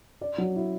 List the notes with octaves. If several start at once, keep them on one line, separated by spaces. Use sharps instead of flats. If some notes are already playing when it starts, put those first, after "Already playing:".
D5
F#3
E4